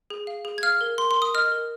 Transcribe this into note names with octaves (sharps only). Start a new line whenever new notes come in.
G#4
F5
G#4
G#6
F5 F6
A#4
A#4 C6
C6
A#4
D#6
D#5 F6
A#4